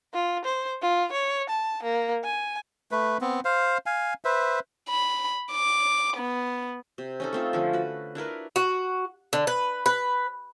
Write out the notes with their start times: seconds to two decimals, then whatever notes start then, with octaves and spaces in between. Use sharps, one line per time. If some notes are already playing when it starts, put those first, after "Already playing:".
0.14 F4
0.45 C5
0.82 F4
1.12 C#5
1.50 A5
1.83 A#3
2.24 G#5
2.91 A3 B4
3.21 B3 C4
3.45 C5 F5
3.86 F5 G#5
4.25 B4 C5 E5
4.89 B5
5.52 D6
6.17 B3
6.98 C3
7.20 C#4 D#4 A4
7.33 A3 C4 F4
7.53 D3 F3 C#4
7.73 F#4 B4
8.15 D4 E4 A#4 B4
8.56 F#4
9.33 D3
9.47 B4
9.86 B4